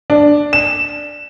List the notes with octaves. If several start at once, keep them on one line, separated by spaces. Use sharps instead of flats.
D4
E7